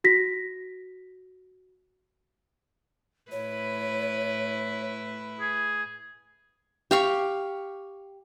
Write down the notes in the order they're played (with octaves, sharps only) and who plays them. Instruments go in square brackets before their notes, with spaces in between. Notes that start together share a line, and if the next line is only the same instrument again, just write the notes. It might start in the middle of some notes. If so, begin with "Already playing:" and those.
[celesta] F#4 A#6 B6
[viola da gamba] A2 E4 B4 [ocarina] C#5
[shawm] G#4
[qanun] G4 F5 C#6